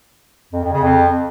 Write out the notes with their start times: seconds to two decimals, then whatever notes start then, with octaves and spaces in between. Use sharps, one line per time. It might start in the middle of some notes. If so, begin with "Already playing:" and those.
0.52 F2
0.62 F2
0.72 C#3
0.83 F2